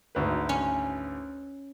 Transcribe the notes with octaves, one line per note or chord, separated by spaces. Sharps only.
G#1 D2 B4
C#4